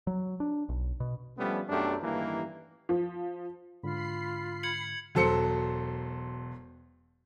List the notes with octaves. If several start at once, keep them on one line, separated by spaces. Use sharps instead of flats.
F#3
D4
B1
B2
F3 G3 A3 B3 C#4 D4
B1 F#2 A3 D4 G4
A1 G2 D#3 E3 A#3
F3
G#2 D3 F4 B5 C7
G#6 C#7 F#7
E1 F#3 A4 C5 C#7